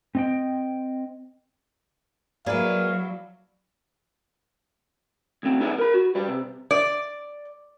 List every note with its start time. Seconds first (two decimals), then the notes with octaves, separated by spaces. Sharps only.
0.15 C4 D#5 G5
2.46 F#3 A#3 D4 E4 G#4 B4 F5
5.43 D2 C4
5.60 B3 D#4 E4 G#4 B4
5.78 A#4 B5
5.94 F#4
6.15 G3 B4
6.28 C3
6.71 D5